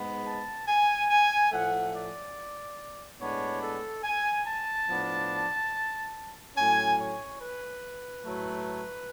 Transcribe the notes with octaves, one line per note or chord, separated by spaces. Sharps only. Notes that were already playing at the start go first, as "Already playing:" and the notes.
Already playing: G#2 G#3 B3
A5
G#5
G#5
A2 F3 A3 F#5
D5
A2 G#3 B3 D4 C#5
A4
G#5
A5
A2 F3 B3 D4
A2 F#3 C#4 G#5
C#5
B4
A2 F#3 A3